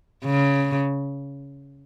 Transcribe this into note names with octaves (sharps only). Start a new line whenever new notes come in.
C#3